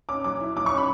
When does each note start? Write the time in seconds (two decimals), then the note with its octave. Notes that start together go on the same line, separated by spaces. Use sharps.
0.09 C#4 D6
0.24 F#3 D6
0.41 E4
0.56 F#3 D6
0.66 C#6
0.72 C#4
0.78 B5